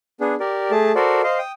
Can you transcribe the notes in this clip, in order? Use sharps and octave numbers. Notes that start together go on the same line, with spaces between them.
B3 D4 G#4
G4 A#4 D5
A3 G#4 A5
F#4 A4 A#4 C5 D5
C5 D#5 F5
G5 D#6